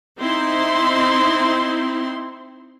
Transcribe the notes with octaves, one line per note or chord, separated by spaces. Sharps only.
C4 D#4 E4 C6